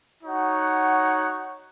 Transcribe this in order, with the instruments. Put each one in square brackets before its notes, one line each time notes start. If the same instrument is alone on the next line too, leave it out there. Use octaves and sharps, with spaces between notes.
[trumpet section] D#4 F#4 C#5 F#5